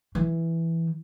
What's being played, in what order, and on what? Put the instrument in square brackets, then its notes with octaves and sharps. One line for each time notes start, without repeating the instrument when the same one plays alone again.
[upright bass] E3